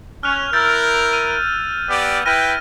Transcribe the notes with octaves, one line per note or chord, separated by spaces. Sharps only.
C#4 F6 F#6 F7
E4 A#4 E6 G6 A6
F6 D#7
B3 G4 D5
E4 B4 G5 F6 A#6 D#7